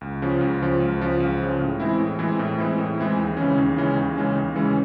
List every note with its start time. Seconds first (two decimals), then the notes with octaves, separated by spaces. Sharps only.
0.01 C#2
0.22 C#3 F3
0.41 C#2
0.62 C#3 F3
0.80 C#2
1.00 C#3 F3
1.20 C#2
1.40 C#3 F3
1.60 A2
1.80 E3 G#3 C4 E4
1.99 A2
2.19 E3 G#3 C4 E4
2.39 A2
2.58 E3 G#3 C4 E4
2.78 A2
2.98 E3 G#3 C4 E4
3.17 D#2
3.37 C#3 E3 G#3 C#4
3.58 D#2
3.76 C#3 E3 G#3 C#4
3.96 D#2
4.16 C#3 E3 G#3 C#4
4.35 D#2
4.56 C#3 E3 G#3 C#4